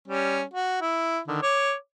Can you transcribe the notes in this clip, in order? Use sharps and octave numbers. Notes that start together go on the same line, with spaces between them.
G3 C#4
F#4
E4
D3 D#3
C#5 D6